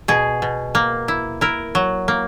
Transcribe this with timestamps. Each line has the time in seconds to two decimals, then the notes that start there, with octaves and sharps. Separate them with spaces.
0.08 B2 G#4
0.42 B2
0.75 A#3
1.08 E4
1.41 E4 A#4
1.75 F#3
2.08 A#3